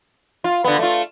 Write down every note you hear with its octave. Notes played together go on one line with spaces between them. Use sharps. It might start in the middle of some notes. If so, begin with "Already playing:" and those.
F4
D3 B3
A3 F4